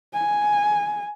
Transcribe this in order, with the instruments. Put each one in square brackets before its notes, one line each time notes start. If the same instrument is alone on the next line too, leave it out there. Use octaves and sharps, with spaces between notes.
[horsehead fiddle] G#5